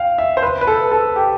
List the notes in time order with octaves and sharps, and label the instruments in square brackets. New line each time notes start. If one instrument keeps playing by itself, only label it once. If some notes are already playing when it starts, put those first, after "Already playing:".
Already playing: [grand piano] F5 G5
E5
C5
B4
B4
A4
A4
G4